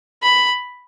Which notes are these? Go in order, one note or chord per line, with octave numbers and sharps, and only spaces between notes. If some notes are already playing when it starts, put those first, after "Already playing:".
B5